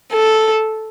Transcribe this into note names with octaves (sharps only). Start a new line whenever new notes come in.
A4